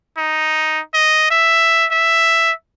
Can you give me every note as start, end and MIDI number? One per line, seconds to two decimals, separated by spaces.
0.18 0.80 63
0.94 1.26 75
1.31 1.85 76
1.91 2.52 76